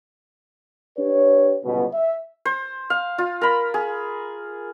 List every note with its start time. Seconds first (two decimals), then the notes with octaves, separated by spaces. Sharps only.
0.97 D4 G4 B4 C#5
1.64 G1 C#2 B2
1.93 E5
2.45 C5
2.90 F5
3.18 F4
3.41 A#4 B5
3.74 G#4